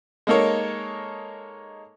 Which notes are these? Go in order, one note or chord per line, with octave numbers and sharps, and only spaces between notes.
G#3 A#3 D#4 A4 A#4 C#5